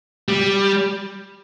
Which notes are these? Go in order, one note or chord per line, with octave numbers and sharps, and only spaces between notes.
G3